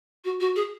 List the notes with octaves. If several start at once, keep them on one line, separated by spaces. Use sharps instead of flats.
F#4
F#4
G#4